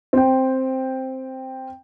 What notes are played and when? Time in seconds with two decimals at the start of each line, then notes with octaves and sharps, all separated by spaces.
0.13 C4 G5